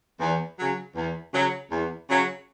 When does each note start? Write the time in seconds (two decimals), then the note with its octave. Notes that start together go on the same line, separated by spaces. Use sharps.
0.19 E2
0.58 C#3 F#3
0.95 E2
1.33 C#3 F#3
1.71 E2
2.09 C#3 F#3